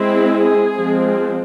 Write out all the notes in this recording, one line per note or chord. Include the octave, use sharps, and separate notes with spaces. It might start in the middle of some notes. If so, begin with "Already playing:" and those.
Already playing: G#3 C4 E4
G#4
F3 G#3 C4